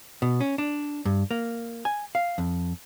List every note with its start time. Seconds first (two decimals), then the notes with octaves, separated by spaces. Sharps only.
0.22 B2
0.41 C#4
0.58 D4
1.05 G2
1.31 A#3
1.85 G#5
2.15 F5
2.38 F2